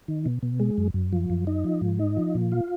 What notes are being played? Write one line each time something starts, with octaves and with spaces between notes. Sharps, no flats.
D#3
B2
B2
G#3
F#2
F#2
F3
F#2
D#4
F3
G#2
D#4
F3
A#2
F4